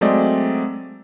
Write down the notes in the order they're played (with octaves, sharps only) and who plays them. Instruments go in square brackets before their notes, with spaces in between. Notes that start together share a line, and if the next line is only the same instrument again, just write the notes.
[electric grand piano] F#3 G#3 A3 C4 D5 D#5